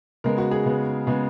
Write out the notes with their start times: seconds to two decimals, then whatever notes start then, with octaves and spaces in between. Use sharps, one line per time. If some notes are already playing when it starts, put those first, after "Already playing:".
0.24 C#3 G#3 B3 A#4
0.38 F#4
0.51 G#4
0.66 C#3 G#3 B3
1.07 C#3 G#3 B3